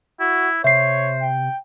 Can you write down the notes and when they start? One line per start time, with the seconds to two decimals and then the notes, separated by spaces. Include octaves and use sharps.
0.20 E4 F#4
0.64 C3 C5 C#5 E5 C7
1.22 G5